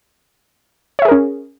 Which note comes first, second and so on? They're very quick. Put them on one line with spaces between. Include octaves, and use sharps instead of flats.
C#5 E5 G#4 A#4 C#4